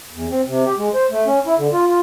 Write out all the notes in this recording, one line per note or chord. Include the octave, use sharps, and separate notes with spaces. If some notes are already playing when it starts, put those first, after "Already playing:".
E2
C4
C3
G4
G#3
C5
A3
C#4
E4
D3
F4
F4